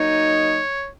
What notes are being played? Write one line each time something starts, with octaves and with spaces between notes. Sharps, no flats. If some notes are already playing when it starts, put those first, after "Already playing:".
Already playing: F#3 A#3 D#4 C#5